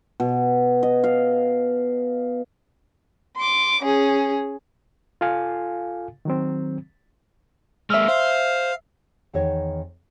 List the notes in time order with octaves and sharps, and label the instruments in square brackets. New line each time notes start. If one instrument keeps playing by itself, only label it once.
[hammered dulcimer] B2
D#5
F5
[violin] C6 D6
C#4 G#4
[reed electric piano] F4 A4 F5 G#5
D#3 F#3 C4
[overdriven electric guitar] G#3 A#3 [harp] E5 E6 F6
[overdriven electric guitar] C5 [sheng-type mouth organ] F5
[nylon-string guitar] E2 D#3 D#4 C#5